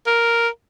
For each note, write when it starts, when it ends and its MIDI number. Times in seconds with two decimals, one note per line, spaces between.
0.07 0.49 70